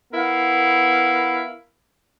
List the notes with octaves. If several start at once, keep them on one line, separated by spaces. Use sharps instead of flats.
B3 E4 A#4 F5